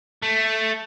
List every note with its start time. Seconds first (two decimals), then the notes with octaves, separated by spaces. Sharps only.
0.22 A3